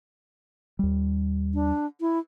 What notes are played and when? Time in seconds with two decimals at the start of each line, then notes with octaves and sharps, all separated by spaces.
0.79 D#2 G3
1.54 D4
2.01 E4